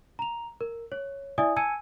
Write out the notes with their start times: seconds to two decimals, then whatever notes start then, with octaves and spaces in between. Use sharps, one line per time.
0.19 A#5 F7
0.61 A#4
0.92 C#5
1.38 E4 D5 E5 G#5 D#6
1.56 G#5 A5 E6 G#6 C#7 D#7